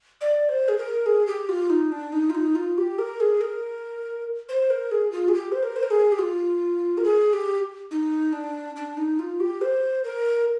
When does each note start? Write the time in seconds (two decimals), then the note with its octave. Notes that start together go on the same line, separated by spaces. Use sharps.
0.21 D5
0.49 C5
0.68 G#4
0.78 A#4
1.06 G#4
1.27 G4
1.49 F4
1.70 D#4
1.92 D4
2.12 D#4
2.30 F4
2.35 D#4
2.55 F4
2.78 G4
2.98 A#4
3.20 G#4
3.41 A#4
4.49 C5
4.70 A#4
4.91 G#4
5.12 F4
5.28 G#4
5.34 G4
5.52 C5
5.63 A#4
5.76 C5
5.83 A#4
5.90 G#4
6.12 G4
6.19 F4
6.97 A#4
7.04 G#4
7.33 G4
7.91 D#4
8.33 D4
8.76 D4
8.97 D#4
9.19 F4
9.40 G4
9.61 C5
10.04 A#4